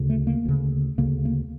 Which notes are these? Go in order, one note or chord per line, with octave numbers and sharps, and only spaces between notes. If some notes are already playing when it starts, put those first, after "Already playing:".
Already playing: D2 C#3
A3
A#3
D2 C#3
D2 C#3 A#3
A#3